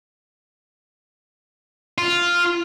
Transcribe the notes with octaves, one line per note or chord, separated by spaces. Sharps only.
F4